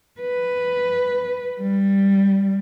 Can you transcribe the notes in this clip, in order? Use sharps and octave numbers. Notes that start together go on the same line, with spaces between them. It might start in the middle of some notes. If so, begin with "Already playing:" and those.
B4
G3